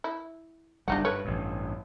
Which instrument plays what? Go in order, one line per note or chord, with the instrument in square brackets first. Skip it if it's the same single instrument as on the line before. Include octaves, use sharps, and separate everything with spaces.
[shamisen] E4
[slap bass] F#1 G3 [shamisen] D4 D#4 F#4
[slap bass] G2 [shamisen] B4 C#5
[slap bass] A1 G2